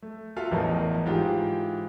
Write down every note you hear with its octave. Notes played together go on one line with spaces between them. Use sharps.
A3
F4 F#4 A4 E5 F5
A1 E2 A2 A#4 D#5 A5
G#2 E3 F4 G4